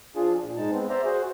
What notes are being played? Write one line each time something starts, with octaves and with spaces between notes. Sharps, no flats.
F3 D4 F4 G#4
A#2
G#2 G#3 D#4 A5
G#3 B3 C4
C5 D5 E5 A#5
F#4 G#4 C5